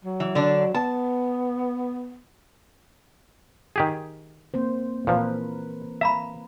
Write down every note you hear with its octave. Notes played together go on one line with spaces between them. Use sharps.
F#3
E3
D3 D4
B3 A5
D#3 G4 G#4
A#3 C4 C5
A#2 E3 F3 A#4 B4
E5 F5 A#5 B5